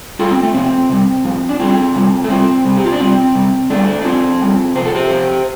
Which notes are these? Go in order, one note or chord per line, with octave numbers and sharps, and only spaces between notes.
A2 G3 F4 A4
C4
A3
C3 F3 C4
C3 G3
A2 F3
D4
A2 G3 C4 F4
C3 G3
A3
C3 G3 C4
C3 G3
G4
F4
D4
C3 G3 C4
C3 G3
A2 G3 A3 D4
D4
A2 G3 C4 F4
A2 G3
C3 F3 C5
A4
G4 C5
C3 F3